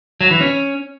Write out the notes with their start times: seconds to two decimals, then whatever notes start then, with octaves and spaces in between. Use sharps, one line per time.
0.21 F#3
0.31 E3
0.41 C#4